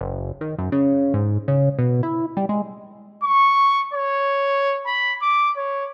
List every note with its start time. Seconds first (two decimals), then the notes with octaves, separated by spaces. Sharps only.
0.01 F#1
0.41 D#3
0.58 F#2
0.72 C#3
1.14 G#2
1.48 C#3
1.79 B2
2.03 E4
2.37 G3
2.49 G#3
3.23 C#6
3.94 C#5
4.86 B5
5.22 D6
5.57 C#5